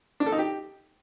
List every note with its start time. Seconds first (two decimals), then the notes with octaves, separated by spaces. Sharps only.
0.20 D4
0.26 A4
0.32 D#4
0.38 G4